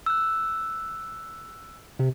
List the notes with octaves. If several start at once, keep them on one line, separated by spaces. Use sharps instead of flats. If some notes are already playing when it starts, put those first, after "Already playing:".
E6 F#6
C3